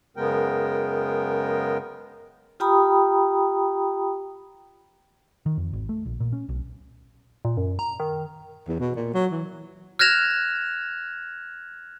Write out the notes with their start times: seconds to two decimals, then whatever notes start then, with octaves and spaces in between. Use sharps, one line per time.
0.17 F#2 C#3 G#3 B3 A#4 G5
2.60 F4 G4 G5 A#5 B5 D#6
5.46 D#3
5.57 F2
5.73 G#1
5.89 A3
6.06 A#1
6.20 A#2
6.33 C#4
6.49 B1
7.45 A#2
7.57 F#2
7.79 A#5
8.00 D#3
8.68 E2
8.79 B2
8.95 A#2
9.14 F#3
9.31 E3
9.99 F6 F#6 G#6 A#6 E7 F7